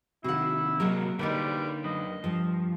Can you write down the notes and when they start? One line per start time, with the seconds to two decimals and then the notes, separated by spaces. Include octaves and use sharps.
0.24 C3 D#3 E4 F#4 F#5
0.80 C3 F#3 G#3 A#3 F#4 A#4
1.19 D3 G3 A#3 D#4 A#4 B4 C#5
1.84 F#2 B4 D#5
2.24 G2 F3